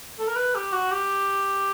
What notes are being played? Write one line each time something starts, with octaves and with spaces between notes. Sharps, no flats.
A4
A#4
B4
G4
F#4
G4